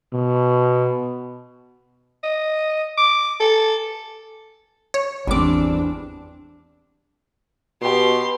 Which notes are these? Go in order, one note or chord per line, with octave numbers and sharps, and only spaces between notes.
B2
D#5
D6
A4
C#5
G#1 E2 G3 C4 D4 D6
B2 G4 C6